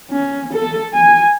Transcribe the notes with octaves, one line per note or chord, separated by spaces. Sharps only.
C#4
A4
G#5